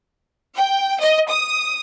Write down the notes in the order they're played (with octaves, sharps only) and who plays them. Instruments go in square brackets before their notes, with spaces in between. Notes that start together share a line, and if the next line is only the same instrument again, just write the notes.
[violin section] G5
D#5
D#6